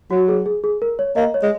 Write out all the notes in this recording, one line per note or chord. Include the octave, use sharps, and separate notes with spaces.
F#3 F#4
G#4
G#4
G#4
A#4
C#5
A#3 D#5
C#5
G#3